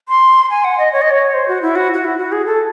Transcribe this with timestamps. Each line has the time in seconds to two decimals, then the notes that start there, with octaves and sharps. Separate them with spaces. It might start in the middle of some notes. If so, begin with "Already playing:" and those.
0.09 C6
0.50 G#5
0.64 F#5
0.78 D#5
0.93 C#5
1.02 D#5
1.10 C#5
1.34 C5
1.48 F#4
1.62 E4
1.76 F#4
1.94 F#4
2.04 E4
2.18 F#4
2.32 G#4
2.46 A4